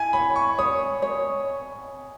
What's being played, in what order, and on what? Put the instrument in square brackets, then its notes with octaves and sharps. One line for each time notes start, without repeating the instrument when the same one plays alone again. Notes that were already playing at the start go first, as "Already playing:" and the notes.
Already playing: [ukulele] E4 [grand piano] G#5
[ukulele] C#5 [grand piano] B5
[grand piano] C#6
[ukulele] C#5 [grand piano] D#6
[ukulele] C#5